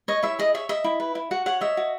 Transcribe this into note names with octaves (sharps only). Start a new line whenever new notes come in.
C#5 D#5
E4 E5
G#4 D#5
C#5 E5
D#5 E5
E4
B4
E4
F#4 F#5
C#5 F#5
D#5 E5
F#4